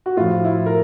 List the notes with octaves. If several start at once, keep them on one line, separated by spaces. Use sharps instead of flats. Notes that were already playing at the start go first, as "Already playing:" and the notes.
F#4
A2 F3 F4
E4
A#4